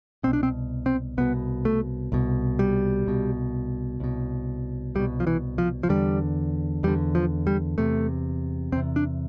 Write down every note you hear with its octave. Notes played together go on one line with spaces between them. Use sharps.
C2 B2 C4
D4
C4
C4
C2 B2 B3
A3
C2 B2
G3
C2 B2
C2 B2
C2 B2 G3
F3
E3
F3
F3
E2 D3 G3
E2 D3 G3
F3
G3
E2 C3 A3
E2 C3 C4
D4